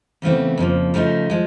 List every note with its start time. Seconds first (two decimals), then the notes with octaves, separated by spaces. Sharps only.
0.22 E2 C#3 E3 A3 C4
0.58 F2 C#3 F3 A#3
0.94 C#3 F3 A3 C4 D#4
1.30 F3 G#3